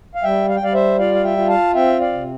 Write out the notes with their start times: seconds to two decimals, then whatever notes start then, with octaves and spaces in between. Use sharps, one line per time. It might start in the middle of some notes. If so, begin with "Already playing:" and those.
0.15 F5
0.23 G3 E5 G5
0.49 F5
0.56 G5
0.61 G3 D5 F5
0.74 C5 E5
0.99 F4 D5 F5
1.14 F5
1.24 E5 G5
1.37 F4
1.49 F5 A5
1.75 C4 E5 G5
2.00 D5 F5
2.13 C3